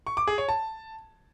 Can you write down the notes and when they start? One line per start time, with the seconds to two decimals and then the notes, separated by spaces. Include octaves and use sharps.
0.07 C#6
0.17 D6
0.28 G#4
0.38 C#5
0.49 A5